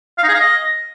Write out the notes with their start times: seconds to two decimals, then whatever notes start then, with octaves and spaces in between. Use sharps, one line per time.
0.18 F5
0.23 D#4
0.29 G#4
0.34 F5
0.39 D#5